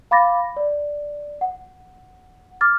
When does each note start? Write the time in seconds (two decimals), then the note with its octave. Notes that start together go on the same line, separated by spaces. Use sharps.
0.11 F5 B5 D6 A6 A#6
0.57 D5
1.41 F#5
2.61 D6 F6 A6